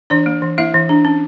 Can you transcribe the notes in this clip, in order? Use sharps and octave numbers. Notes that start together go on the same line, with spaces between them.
E3 D4 D5
A#3
E3
A#3 E4 E5
E3
D4
C#4